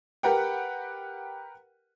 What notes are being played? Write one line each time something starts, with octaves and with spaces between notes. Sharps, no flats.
G4 A#4 B4 F#5 G5